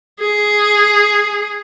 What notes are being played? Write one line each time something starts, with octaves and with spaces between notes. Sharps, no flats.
G#4